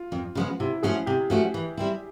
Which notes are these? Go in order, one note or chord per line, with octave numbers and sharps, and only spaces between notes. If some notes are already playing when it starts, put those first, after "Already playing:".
Already playing: F4
F2
C#3 F3 G#3 B3
C3 E4
F3 A3 C#4 F#4 G#4
C3 G4
F3 A3 C#4 F#4
E3
G3 C4 E4